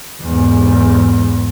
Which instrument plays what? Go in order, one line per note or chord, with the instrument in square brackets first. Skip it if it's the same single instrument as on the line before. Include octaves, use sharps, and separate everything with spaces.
[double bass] E2 G#2